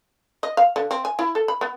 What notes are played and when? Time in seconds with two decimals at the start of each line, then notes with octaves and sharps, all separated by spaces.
0.43 D#5
0.57 F5
0.76 D3
0.91 C4
1.05 G#5
1.19 E4
1.35 A4
1.48 B5
1.61 B3